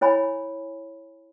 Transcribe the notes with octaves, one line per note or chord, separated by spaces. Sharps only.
E4 C#5 G#5 B5